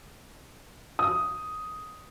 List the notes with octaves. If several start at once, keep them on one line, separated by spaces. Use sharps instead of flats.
D#6